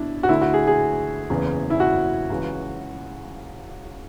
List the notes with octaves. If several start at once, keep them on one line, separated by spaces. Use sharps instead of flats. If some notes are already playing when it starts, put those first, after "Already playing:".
Already playing: B2 D4 E4
F#4
D2 D3 E4
F#4
G#4
G#4
F#1 E2 C#3 E3
E4
F#4
C#2 C#3 E3